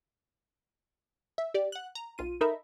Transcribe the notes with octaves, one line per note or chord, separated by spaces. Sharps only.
E5
G4 D5
F#5 F#6
A#5
B1 F4 D#7
D#4 A4 A#4 E5 A#5 B5